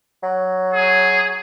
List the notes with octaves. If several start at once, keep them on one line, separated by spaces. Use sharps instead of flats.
F#3
G#4